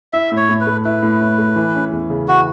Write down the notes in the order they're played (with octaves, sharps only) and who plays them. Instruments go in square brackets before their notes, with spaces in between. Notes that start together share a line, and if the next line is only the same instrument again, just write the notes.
[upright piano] E4 [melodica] E5
[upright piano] A2
[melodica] C#5
[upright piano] A2
[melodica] B4
[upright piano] A3
[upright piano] E4 [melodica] B4
[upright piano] A2
A2
A3
E3
C#4
E2
C#3
[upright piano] E3 [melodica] F#4